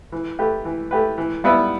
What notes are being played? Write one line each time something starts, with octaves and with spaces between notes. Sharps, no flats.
E3
A3 G4 B4
E3
A3 G4 B4
E3
G3 B3 E4 B4